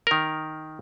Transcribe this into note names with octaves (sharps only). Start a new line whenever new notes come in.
D#3 A#4